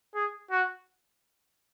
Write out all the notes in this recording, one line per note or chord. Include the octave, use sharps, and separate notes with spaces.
G#4
F#4